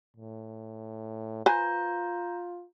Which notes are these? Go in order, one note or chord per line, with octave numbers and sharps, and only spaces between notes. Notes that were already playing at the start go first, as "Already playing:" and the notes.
A2
F4 B4 C5 G#5 A#5 G6